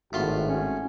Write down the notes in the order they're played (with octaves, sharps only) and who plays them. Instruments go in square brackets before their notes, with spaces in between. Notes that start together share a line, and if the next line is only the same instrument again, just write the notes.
[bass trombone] G#1 [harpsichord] A2 F4 C6 [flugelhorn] F#4
[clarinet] C#4